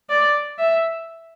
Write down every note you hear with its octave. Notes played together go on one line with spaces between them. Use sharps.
D5
E5